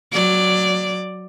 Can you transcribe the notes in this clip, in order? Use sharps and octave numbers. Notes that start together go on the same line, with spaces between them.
F#3 D5